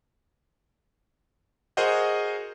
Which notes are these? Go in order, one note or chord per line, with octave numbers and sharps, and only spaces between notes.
F#4 G#4 A#4 C5 D#5 F#5